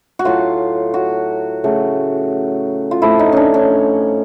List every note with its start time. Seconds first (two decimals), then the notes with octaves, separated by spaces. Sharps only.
0.19 F#4
0.24 A2 F#3 A3 F4
0.94 F#4
1.64 C#3 F#3 A3
2.91 F4
3.02 A2 F3 A3 E4
3.19 D#4
3.32 C#4 D4
3.54 C#4